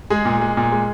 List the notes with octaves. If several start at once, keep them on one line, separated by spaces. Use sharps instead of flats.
G#3 G#4
A#2
G#3
A#2
G#3